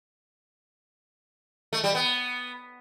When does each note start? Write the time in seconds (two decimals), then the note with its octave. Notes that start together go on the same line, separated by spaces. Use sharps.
1.73 A3
1.84 G3
1.95 B3